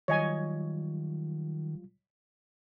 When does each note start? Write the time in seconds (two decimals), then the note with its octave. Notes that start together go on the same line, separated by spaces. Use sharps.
0.08 D#3 F#3 G3 F4 C#5 D#5 G#5